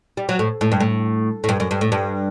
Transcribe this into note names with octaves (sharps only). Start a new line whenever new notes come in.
G3
F#3
A2
A2
G2
A2
A2
G2
F#2
G2
A2
G2